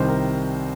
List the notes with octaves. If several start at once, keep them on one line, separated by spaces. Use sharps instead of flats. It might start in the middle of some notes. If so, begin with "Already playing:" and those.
Already playing: C2 C3 D#3 C5
A#4